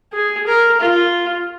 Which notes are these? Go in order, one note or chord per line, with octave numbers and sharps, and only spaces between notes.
G#4
A#4
F4